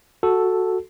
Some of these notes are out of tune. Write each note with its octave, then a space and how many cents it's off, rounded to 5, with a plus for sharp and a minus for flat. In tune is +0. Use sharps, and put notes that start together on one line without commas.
F#4 +0 A4 +0